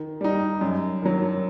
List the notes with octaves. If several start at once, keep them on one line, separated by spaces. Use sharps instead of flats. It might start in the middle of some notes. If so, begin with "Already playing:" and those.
Already playing: D#3
G3 D#4
F#2
D#3 F#3